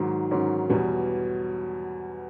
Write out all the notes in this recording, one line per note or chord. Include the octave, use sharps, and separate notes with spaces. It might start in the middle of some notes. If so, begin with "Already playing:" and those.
Already playing: G#2 D#3 F#3
G#2 D#3 F#3 C#4
E2 B2 G3